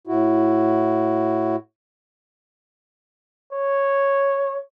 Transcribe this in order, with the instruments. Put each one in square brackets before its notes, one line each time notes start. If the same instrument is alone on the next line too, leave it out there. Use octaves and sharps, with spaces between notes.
[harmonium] A2 E4 F#4
[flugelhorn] C#5